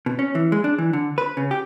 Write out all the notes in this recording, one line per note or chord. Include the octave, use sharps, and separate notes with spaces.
B2
C#4
E3
G#3
D4
E3
D3
B4
C#3
G4